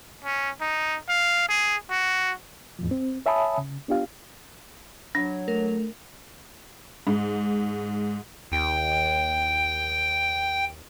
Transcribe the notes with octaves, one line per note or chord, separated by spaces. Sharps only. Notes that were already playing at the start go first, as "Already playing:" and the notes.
C#4
D#4
F5
G#4
F#4
E2 A2 F3
C4
C#5 E5 G#5 A5 B5 D#6
C#3
B3 D4 F4 G4 F5
F#3 D4
A3 A#4
G#2
D#2 G5